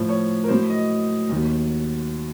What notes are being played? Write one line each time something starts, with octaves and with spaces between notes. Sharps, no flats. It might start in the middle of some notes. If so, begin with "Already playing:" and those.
Already playing: A2 F3
C#5
A#4
A2 F#3 C5
D#5
D#2 D#3 F#3